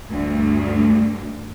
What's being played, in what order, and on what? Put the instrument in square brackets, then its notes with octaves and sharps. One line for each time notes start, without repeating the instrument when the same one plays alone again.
[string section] D2 G2